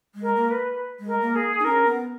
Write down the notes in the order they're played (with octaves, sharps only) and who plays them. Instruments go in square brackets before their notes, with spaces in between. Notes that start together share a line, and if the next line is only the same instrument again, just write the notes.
[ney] G#3
[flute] A#4
[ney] A#3
[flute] B4
[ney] G#3
[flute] A#4
[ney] A#3
[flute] G#4
[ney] D#4
[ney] C#4 [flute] A#4
[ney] B3